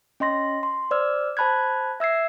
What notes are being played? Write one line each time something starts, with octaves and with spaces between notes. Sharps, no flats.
C#4 D#5 C6 A#6
C6
C5 D5 E6 F6
C5 A5 B5 F#6 G#6
E5 E6 G#6 C7